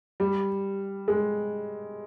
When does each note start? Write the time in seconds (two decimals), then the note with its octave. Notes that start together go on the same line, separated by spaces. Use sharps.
0.20 G3
1.08 G#3